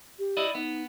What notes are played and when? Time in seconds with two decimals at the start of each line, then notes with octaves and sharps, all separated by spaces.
0.19 G4
0.37 E4 D5 D#5
0.55 B3 D#4